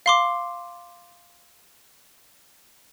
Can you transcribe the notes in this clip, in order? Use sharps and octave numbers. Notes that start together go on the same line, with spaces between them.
F5 C6 D6